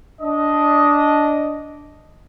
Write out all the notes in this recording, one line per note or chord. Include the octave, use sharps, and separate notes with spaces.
D4 D#5